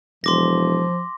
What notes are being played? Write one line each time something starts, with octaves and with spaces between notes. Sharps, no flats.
E1 F3 C6 D6 A#6